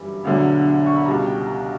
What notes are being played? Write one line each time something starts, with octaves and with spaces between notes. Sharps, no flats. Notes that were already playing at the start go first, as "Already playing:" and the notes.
Already playing: G1 F#2 E3 G3 B5
E1 D2 D3 F#3
C#6
B5
C#2 B2 G3 A#5
G5
A#5